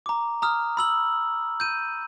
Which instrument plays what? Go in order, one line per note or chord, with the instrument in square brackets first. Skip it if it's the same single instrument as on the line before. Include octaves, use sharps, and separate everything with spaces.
[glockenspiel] A#5 D6
A#5 D#6 F6
B5 E6 F#7
G6 D#7